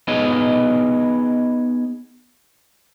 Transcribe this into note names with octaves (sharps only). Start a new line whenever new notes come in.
B3 D#4 G#4 C#5 D#5